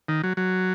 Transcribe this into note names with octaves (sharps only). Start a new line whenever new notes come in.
D#3
F#3
F#3